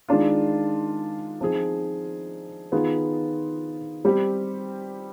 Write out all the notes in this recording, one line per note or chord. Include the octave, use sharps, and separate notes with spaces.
D#3 G#3 D4 F4
F3 C4 D#4 G#4
D#3 B3 F4 G#4
G3 C4 G4